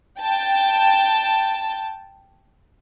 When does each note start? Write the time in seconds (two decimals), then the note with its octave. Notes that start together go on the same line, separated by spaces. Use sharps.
0.19 G5 A5